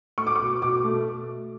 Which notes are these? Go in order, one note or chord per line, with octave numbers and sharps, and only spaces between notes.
A3 C#6
D6
C#6
B2
B2 D6
A3